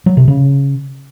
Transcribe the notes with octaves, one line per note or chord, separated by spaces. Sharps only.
F#3
C3
C#3